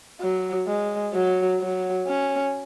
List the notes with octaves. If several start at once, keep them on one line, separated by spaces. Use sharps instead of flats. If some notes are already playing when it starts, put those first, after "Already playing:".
F#3
G#3
F#3
F#3
C#4